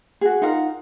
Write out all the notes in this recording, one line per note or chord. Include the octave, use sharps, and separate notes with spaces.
F#4 G#4
D#4 F4 A#4 F#5